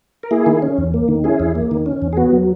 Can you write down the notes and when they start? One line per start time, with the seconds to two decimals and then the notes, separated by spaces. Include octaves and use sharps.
0.23 A#4
0.31 A#3 E4 G#4
0.46 D#3
0.62 C#4
0.78 E2
0.94 A#3
1.08 D#3
1.24 C#4 E4 G#4
1.40 E2
1.55 A#3
1.71 D#3
1.86 C#4
2.02 E2
2.13 G#4
2.17 B3 F#4
2.32 F#3